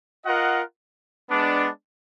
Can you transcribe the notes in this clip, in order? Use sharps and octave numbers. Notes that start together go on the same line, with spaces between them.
F4 A#4 D#5 F#5
G#3 B3 D4